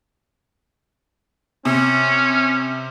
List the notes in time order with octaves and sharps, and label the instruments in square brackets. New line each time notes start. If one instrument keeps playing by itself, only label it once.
[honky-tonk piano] C3 [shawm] C#4